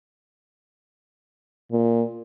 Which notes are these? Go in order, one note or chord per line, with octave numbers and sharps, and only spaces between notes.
A#2